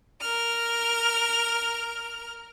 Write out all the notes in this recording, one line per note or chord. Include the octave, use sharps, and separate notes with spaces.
A#4 F6